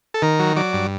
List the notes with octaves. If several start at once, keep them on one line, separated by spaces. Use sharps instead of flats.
A4
D#3 A#4
F#3
F#3 D5
G2